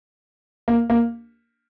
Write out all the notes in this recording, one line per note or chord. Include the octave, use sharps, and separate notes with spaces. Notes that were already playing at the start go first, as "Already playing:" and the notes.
A#3
A#3